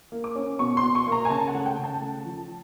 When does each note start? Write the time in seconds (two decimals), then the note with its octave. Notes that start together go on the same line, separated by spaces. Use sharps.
0.12 A#3
0.24 D6
0.35 C#4
0.59 B2 C#6
0.77 C6
0.83 B2
0.95 C#6
1.07 A#3
1.12 A#5
1.25 G#5
1.30 C#3 A5
1.48 F#5
1.54 A3
1.66 G5
1.77 C#3
1.84 A5
2.01 A3
2.25 F3